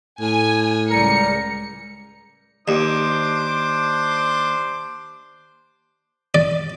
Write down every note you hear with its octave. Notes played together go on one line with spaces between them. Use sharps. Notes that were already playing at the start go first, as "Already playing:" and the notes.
A2 G#5
C#2 G3 A#4 A#5 C#7
D#2 D4 C5 D6
D5